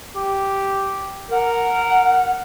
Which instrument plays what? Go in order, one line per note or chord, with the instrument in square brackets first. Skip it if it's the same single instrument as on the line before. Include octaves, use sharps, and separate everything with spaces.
[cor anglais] G4
[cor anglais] A#4 [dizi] F#5